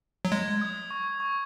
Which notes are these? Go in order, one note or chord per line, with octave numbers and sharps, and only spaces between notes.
F#3
G#3 G#6
D#6
C#6
C#6